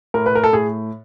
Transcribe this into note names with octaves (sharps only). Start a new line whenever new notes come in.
A2 A#4
B4
A#4
A4
A2 G#4